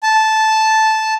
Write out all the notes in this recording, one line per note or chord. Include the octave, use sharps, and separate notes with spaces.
A5